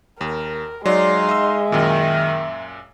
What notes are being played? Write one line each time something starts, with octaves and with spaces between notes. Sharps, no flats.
D#2 A#4
F#3 G#3 D#4 D5 F5 C6
D#5 E5 E6
F#2 A#2 D#3